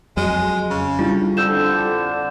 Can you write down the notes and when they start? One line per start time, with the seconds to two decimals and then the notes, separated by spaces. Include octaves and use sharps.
0.17 F2 F#3 G#3
0.70 C#3
0.99 G3 D4 E4 F4
1.37 F2 D3 E6 G6 E7